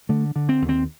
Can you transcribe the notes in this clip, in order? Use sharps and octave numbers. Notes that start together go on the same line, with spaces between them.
D3 A3
D3
C4
D#2
C4